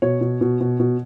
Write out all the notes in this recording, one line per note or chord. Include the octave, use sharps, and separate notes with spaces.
B2 C#5
B2
B2
B2
B2